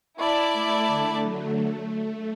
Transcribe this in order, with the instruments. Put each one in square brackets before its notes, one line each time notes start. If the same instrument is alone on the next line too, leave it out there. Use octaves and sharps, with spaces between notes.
[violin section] E4 D5 A5
[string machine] A3
D3
F#3
A3
A3